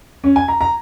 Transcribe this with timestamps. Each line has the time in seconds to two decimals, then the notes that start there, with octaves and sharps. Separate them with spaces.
0.24 C#4
0.36 G#5
0.48 A#5
0.61 A#5